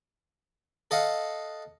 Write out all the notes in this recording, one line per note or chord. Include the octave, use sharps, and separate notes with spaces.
A4 D#5 F5 F#5